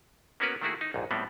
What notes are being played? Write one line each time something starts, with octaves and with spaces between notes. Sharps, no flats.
A#3 B3 C#4 F#4 A#4 B4
D#3 A3 A#3 E4 F#4 G#4
D#4
A#1 D#2 G#2
A2 G3 B3 C4